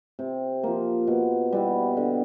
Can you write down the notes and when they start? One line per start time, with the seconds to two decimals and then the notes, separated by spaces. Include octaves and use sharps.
0.19 C3
0.64 F3 A#3
1.07 B2
1.52 G3 B3 E4
1.97 D3